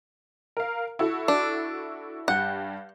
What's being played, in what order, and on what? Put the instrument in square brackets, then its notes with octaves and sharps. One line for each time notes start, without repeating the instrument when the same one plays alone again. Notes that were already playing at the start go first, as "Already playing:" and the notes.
[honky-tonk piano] A#4 F5
E4 F#4 A4
[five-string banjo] D4
[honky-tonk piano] G2 G4 G6 [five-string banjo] F#5